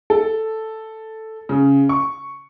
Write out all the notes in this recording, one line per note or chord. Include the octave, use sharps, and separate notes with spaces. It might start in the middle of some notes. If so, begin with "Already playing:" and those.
A4
C#3
C#6